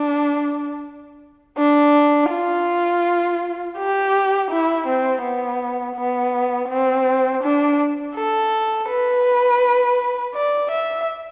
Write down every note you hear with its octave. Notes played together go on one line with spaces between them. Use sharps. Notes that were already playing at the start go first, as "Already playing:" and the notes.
Already playing: D4
D4
F4
G4
E4
C4
B3
B3
C4
D4
A4
B4
D5
E5